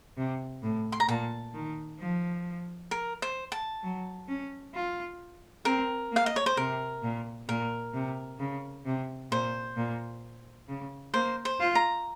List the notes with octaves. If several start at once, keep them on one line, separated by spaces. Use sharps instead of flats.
C3
A2
C6
A#5
A#2 A5
D#3
F3
A#4
C5
A5
F#3
C#4
F4
C4 A#4
A#3 F5
D#5
C#5
C5
C3 A#4
A#2
A#2 A#4
C3
C#3
C3
A#2 C5
A#2
C#3
A#3 C5
C5
F4
A#5